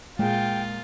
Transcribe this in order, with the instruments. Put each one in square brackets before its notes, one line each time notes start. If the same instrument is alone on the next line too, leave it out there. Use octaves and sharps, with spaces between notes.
[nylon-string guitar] A#2 G#4 [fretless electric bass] G#3 [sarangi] F4 [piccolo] G5